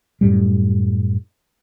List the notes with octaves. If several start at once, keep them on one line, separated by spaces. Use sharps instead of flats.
F#2 A2 G3